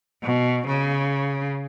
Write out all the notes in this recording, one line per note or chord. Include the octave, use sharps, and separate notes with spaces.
B2
C#3